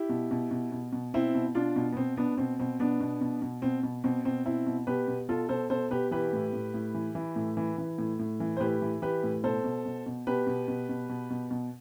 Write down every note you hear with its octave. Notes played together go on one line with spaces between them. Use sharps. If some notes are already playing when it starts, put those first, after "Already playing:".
Already playing: E4 G4
B2
B2
B2
B2
B2
B2 C4 E4
B2
B2 D4 F4
B2
B3
B2 C4
B2 B3 D4
B2 C4
B2 C4
B2 B3 D4
B2
B2
B2
B2 C4
B2
B2 C4
B2 C4
B2 C4 E4
B2
B2 G4 B4
B2
B2 F4 A4
B2 A4 C5
B2 A4 C5
B2 G4 B4
E3 G4 B4
A2
A2
A2
E3
E3
A2
E3
E3
A2
A2
E3
C5
A2 G4 B4
E3
E3 G4 B4
A2
B2 A4 C5
B2
B2
B2
B2 G4 B4
B2
B2
B2
B2
B2
B2